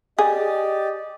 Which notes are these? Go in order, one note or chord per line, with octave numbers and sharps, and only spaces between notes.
G4 G#4 D5 D#5